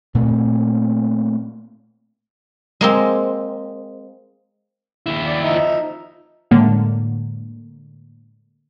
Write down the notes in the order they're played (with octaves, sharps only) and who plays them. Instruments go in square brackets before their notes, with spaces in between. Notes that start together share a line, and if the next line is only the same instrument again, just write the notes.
[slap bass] A#2 A3 C4
[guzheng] G#3 A#3 C4
[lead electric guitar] D#2 E4
[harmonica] D5
F3 D#4 E5
[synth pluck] A2 D3 G#3 A#3